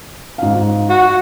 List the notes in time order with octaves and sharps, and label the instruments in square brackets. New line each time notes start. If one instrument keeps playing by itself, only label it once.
[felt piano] G#2 F5
[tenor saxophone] F#4